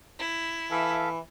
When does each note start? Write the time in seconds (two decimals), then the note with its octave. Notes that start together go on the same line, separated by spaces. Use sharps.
0.19 E4
0.71 E3 A4 E5 F5